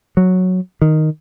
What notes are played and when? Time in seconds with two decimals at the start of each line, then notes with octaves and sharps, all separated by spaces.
0.17 F#3
0.82 D#3